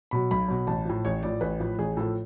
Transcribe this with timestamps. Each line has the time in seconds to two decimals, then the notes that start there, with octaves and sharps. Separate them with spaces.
0.11 B2 F#3 B5
0.31 B1 B5
0.48 B2 F#3
0.67 A1 A5
0.85 A2 F3
1.05 A1 C#5
1.23 A2 F3 D5
1.41 A1 B4
1.60 A2 F3
1.78 A1 G#4
1.97 A2 F3 A4